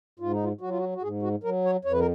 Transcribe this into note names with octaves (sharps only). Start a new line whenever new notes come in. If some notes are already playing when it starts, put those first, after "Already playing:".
G#2 F4
D#4
F4
F#3 F#4
F4
F#4
F#4
G#2 G#4
F#4
F#3 A#4
C#5
F2 C#5
B4
A#4